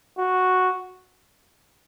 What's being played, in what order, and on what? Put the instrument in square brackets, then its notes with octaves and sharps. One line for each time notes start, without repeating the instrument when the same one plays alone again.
[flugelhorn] F#4